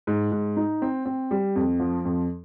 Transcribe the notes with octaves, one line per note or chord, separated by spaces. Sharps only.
G#2
G#2
D#4
C4
C4
G3
F2
F3
F2